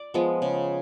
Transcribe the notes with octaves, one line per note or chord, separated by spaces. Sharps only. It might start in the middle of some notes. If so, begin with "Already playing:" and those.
Already playing: D5
F3 G#3 B3
C#3